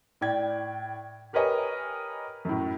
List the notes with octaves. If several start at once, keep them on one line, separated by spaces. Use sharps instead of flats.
A2 D5 G5 G#6
G4 A#4 B4 C#5 D#5 G#5
F#2 A2